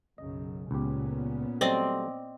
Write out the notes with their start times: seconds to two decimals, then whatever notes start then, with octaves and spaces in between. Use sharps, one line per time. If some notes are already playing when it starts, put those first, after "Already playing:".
0.18 B1 F#2 C#3 D#5
0.71 C#2 A#2 B3 C#4 G4
1.61 F#3 G3 A3 C4 D5 D#5